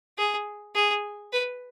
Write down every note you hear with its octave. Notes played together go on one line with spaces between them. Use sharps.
G#4
G#4
B4